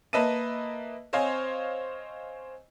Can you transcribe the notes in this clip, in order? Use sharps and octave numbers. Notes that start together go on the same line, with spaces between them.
A#3 B4 D#5 E5 A5 D#7
C4 C5 C#5 D#5 F5 G#5